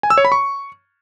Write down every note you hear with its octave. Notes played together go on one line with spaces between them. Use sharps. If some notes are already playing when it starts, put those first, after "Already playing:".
G#5
E6
C#5
B5
C#6